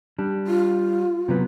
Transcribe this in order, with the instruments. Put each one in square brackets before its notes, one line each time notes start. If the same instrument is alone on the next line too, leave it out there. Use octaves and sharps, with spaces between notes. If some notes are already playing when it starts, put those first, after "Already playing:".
[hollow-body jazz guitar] G3 D4
[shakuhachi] F4
[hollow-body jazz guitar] C3 F#3 B3